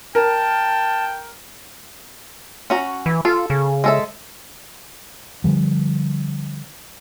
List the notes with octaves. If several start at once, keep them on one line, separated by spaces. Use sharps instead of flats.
A#4 G5 A5
C#4 F#4 A#5
E3
F4 A4
C#3
G#3 A4 E5
D3 F3 G3